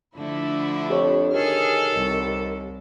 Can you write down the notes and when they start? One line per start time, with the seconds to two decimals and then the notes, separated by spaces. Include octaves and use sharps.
0.17 D3 F3 A3 D4 E4
0.90 F2 G4 C#5
1.34 D#3 G#4 A4 F6
1.96 C2